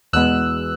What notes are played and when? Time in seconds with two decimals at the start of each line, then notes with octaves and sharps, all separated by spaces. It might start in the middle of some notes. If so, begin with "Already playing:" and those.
0.13 E2 B2 G#3 B3 E6 F#6